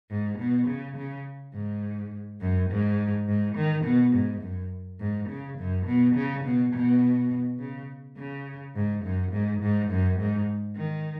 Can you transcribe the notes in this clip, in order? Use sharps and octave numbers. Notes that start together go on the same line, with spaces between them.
G#2
B2
C#3
C#3
G#2
F#2
G#2
G#2
D#3
B2
G#2
F#2
G#2
C#3
F#2
B2
C#3
B2
B2
C#3
C#3
G#2
F#2
G#2
G#2
F#2
G#2
D#3